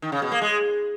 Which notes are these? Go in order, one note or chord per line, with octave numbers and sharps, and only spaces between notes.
D#3
C#3
B2
A#3
G#3